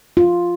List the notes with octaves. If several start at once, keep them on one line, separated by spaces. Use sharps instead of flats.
F4